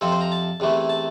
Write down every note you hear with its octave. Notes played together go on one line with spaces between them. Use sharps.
F2 C3 F3 C4 A4
C5
A#5
A5
E2 C3 E3 A3
A5